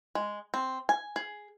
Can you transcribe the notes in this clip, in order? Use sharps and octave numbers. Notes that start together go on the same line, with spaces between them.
G#3
C4
G#5
G#4